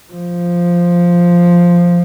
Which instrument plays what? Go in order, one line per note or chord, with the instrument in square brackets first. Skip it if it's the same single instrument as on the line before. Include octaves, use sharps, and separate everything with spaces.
[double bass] F3